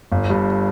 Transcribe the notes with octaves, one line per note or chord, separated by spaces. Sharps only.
G1
G2